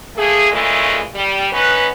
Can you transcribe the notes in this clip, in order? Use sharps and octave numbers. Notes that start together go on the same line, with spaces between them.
A3 A#3 G#4
A#2 C#3 E3 G#3 A3
G3
B3 C#4 D#4 B4